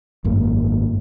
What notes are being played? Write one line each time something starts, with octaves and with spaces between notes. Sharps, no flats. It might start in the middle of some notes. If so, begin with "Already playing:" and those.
G#1 F#2 A#3